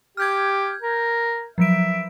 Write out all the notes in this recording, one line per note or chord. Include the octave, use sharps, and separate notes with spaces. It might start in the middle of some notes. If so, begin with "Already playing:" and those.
G4 F6 G6 G#6
A#4
F3 F#3 E5 D7